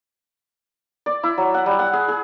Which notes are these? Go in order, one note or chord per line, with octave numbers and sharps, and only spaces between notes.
D5
E4
F#3
F#5
G3
F#5
G#4
G#4